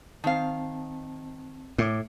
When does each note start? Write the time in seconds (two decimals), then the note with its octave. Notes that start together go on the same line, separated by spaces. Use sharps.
0.24 D#3 C4 F5 A5
1.78 A2 A3 D6